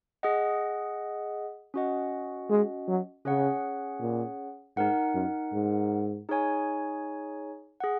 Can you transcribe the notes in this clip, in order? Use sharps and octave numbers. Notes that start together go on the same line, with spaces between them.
G#4 D#5 F#5
C#4 F#4 D#5 F#5
G#3
F#3
C#3 C#4 G#4 C#5 F#5
A#2
G#2 D#4 A#4 F#5
F#2
G#2
D#4 G#4 C#5 G#5
G#4 F#5